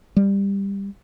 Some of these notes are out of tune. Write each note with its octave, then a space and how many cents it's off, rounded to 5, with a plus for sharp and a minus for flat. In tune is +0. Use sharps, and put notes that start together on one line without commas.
G3 +15